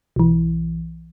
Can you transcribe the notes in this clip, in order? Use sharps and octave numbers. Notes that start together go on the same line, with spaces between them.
B1 E3